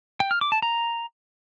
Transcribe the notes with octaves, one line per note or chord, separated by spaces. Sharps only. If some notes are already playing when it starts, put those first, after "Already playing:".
G5
F6
D6
A5
A#5